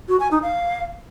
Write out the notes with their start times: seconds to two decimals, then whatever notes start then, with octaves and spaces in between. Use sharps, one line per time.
0.08 F#4
0.19 G#5
0.31 D#4
0.42 F5